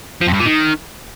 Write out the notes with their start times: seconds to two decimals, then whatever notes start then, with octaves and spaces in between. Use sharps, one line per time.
0.21 F3
0.27 F2
0.33 G2
0.39 A#2
0.46 D#3